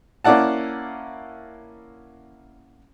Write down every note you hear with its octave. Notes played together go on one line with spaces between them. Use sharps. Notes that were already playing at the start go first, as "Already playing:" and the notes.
A#3 C#4 E4 D5 F#5 A5